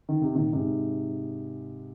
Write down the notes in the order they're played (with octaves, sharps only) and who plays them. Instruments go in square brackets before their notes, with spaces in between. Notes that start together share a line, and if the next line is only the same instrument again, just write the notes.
[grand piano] D#3
C3
A#2 D#3
G#2 C3